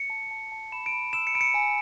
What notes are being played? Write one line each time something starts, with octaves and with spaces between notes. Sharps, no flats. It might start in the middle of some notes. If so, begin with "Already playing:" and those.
Already playing: C#7
A5
A5
A5
B5 E7
D7
B5
E6 E7
C#7
B5 D7
C#7
G#5